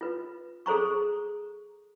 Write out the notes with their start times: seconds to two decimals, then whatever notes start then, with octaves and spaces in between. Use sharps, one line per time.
0.01 F4 B4
0.66 G#4 A4 C5 A#5 C#6